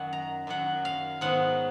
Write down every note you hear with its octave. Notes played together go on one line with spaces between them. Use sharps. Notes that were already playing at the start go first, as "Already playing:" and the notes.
Already playing: F#2 D#3 F#3 F#5 G#5
A#5
F#2 D#3 F#3 F#5
F5
G#2 D#3 F#3 B3 F#5